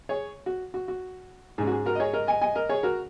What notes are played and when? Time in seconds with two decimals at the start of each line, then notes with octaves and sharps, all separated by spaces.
0.09 G#4 C#5
0.46 F#4
0.74 F#4
0.88 F#4
1.58 G#2 G#3 C#4 G#4
1.67 F#4
1.72 G#4
1.86 F#4 A#4
1.95 D#5
2.00 G#4 C#5
2.13 A#4 D#5
2.27 D#5 G#5
2.41 D#5 G#5
2.55 A#4 D#5
2.69 G#4 C#5
2.83 F#4 A#4